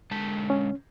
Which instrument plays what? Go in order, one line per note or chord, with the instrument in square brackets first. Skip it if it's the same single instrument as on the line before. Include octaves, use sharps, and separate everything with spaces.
[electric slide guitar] D3 G#3 A5
[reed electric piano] C#4